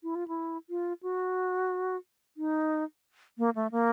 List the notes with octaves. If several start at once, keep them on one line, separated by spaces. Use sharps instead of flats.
E4
F4
E4
F4
F#4
D#4
A#3
A3
A#3